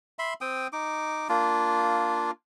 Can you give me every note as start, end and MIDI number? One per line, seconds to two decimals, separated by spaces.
0.19 0.34 76
0.19 0.34 83
0.19 0.34 84
0.41 0.67 60
0.41 0.67 79
0.41 0.67 87
0.73 1.28 63
0.73 1.28 86
1.29 2.31 58
1.29 2.31 62
1.29 2.31 65